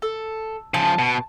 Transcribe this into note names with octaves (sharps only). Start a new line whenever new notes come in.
A4
C#3 F3 A5
B2